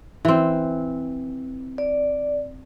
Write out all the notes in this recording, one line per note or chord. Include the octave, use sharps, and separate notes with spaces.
E3 C4
D5